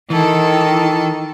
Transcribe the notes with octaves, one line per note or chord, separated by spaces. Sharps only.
D#3 E3 A4